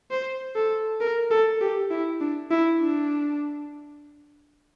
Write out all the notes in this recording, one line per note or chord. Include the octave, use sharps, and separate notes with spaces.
C5
A4
A#4
A4
G4
E4
D4
E4
D4